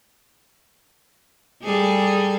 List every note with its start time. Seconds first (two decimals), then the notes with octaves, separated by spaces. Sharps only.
1.62 G3 G#4 A4